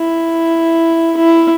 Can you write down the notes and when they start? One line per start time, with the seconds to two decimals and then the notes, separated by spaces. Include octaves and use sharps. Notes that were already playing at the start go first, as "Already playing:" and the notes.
Already playing: E4
1.17 E4